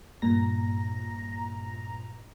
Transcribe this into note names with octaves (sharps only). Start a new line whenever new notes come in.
G2 A#2 A#5 A#6